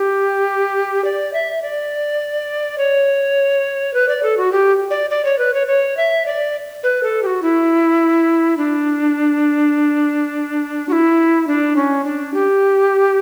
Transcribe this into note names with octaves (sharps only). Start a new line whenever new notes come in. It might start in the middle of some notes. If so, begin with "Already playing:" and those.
Already playing: G4
D5
E5
D5
C#5
B4
D5
A4
F#4
G4
D5
D5
C#5
B4
C#5
C#5
E5
D5
B4
A4
G4
F#4
E4
D4
F#4
E4
D4
C#4
D4
G4